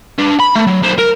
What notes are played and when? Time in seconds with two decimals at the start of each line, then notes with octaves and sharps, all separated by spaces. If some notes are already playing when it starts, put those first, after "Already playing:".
0.18 D4 B4
0.40 B5
0.55 A3
0.67 F#3
0.83 B1 C5
0.99 A#4